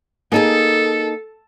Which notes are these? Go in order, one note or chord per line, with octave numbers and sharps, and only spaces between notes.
A#3 D#4 G#4 A4